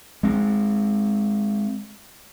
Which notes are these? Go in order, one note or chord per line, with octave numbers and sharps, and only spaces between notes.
G#3 C4